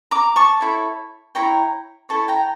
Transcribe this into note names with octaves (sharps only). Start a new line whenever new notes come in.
A#5 D6
A5 C#6
E4 A4 C#5
E4 A4 C#5 G5 A#5
E4 A4 C#5 A5 C#6
G5 A#5